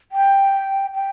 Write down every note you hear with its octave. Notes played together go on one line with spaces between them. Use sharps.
G5
G5